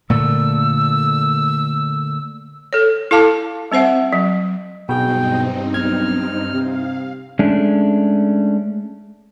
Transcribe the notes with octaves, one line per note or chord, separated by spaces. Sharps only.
A#2 D3 A3 E6
A4 C#5
E4 A4 F5 A5 D6
G3 C4 C5 E5 F#5
F#3
B1 G2 B2 C4 D#4 G#4 G5
B1 F6 G#6
C3 F5
G#3 A3 C#4 D4